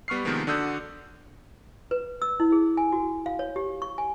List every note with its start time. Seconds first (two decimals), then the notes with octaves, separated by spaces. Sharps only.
0.08 G3 B3 C#6 F6 C7
0.25 C3 D#3 F3 G#3 A#3 B3
0.47 D3 D4 F#4 D#6 E6 G6
1.91 B4
2.22 E6
2.40 E4
2.52 G#4
2.77 G#5
2.92 F#4
3.26 F5
3.39 C#5
3.56 G4
3.82 C#6
3.98 G#5